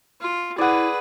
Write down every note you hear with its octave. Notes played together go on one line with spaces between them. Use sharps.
F4
E4 G#4 B4 D5 F#5